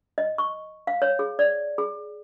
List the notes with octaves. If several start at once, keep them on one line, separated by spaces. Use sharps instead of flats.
D#5
C#6
F5
C#5
G#4
D5
G#4